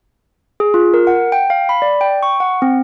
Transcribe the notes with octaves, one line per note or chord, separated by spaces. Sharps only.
G#4
F4
A#4
F#5
G5
F5
B5
D5
G5
C#6
F#5
C4